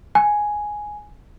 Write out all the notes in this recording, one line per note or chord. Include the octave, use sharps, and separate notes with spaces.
G#5